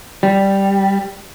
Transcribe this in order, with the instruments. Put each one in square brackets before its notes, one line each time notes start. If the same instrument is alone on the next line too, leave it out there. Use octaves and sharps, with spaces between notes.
[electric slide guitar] G3